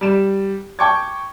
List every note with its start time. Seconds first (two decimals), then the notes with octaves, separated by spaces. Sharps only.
0.01 G3 E7
0.79 G5 A5 C#6 D6 G#6